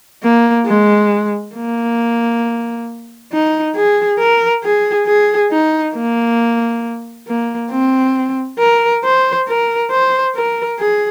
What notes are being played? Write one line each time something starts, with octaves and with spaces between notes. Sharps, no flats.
A#3
G#3
A#3
D#4
G#4
A#4
G#4
G#4
D#4
A#3
A#3
C4
A#4
C5
A#4
C5
A#4
G#4